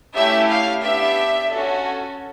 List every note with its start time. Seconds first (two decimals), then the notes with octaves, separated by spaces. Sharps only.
0.15 A3 C#4 E4 G4 E5
0.50 F5
0.83 B3 D4 G4 E5
1.52 C#4 F#4 A4